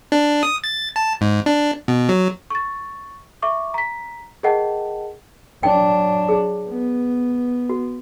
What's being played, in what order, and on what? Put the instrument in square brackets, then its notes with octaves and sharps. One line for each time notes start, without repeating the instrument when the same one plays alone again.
[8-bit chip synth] D4
D#6
A6
A5
G#2
D4
B2
F#3
[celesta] C#6 A6
E5 C#6 D6
A#5 B6
G#4 A#4 D#5 F#5 G5 A5
[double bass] F#3 D4 [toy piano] G5
[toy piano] G#4
[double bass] B3
[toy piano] F#4